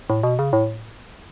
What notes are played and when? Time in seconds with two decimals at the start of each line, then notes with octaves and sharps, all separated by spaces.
0.10 A2
0.23 B2
0.39 C#3
0.53 A2